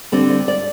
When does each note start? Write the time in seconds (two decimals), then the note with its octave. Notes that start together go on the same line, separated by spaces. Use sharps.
0.12 D3 G3 C4 D5
0.30 D5
0.48 D5